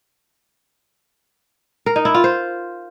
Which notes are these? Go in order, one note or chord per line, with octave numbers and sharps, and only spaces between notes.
A#4
D#4
E4
F4
C5